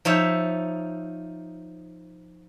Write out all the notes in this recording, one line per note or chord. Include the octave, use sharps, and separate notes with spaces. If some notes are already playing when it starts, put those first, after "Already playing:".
F3 D#4 C#5 E5